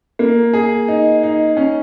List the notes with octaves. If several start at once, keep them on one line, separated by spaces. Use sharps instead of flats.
A#3
G#4
D#4
D#4
C#4